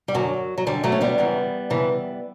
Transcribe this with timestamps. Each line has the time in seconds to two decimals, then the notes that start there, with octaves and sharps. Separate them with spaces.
0.08 G3
0.14 F#2 D3 F#3
0.58 F#3
0.67 F#2 D3 G3
0.84 F#3 A3
0.92 C#4
1.01 G3 B3
1.18 F#2 C#3 E3
1.70 F#2 C#3 E3